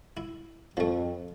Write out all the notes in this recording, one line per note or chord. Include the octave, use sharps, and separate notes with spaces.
E4
F2 F3 A3